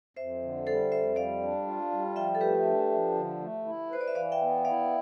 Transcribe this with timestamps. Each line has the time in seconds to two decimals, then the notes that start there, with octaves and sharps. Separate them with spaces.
0.17 F2 C5 E5
0.42 D3
0.66 G3 A4 C5
0.92 F2 C5 E5
1.16 G3 D5 F5
1.41 D4
1.67 F4
1.91 G3
2.16 F3 E5 G5
2.35 A4
2.41 A3 G4 B4
2.66 D4
2.91 F3
3.15 D3
3.41 A3
3.65 E4
3.91 B4 C5
4.01 D5
4.08 E5
4.15 E3 D5 F5
4.32 E5 G5
4.41 B3
4.65 E4 D5 F5